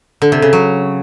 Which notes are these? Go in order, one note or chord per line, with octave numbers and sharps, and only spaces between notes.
D3
C3
C#3
F#3